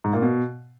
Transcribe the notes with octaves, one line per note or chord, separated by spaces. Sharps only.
G#2
A#2
B2